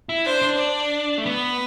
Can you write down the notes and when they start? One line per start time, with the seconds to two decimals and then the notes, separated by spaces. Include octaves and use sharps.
0.09 E4
0.26 D4 C5
0.42 D4
0.58 D5
1.18 A3
1.26 B3 B4